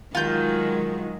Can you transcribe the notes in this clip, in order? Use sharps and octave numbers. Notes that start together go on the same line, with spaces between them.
D#3 F#3 G#3 F4 G6